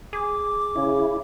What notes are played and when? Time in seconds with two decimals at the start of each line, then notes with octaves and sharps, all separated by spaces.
0.13 G#4 D6
0.76 C#3 E4